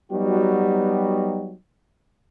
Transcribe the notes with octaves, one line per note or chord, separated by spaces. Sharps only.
F#3 G3 B3 D#4 F#4 G4